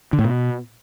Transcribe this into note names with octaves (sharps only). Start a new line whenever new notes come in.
D3
A2
B2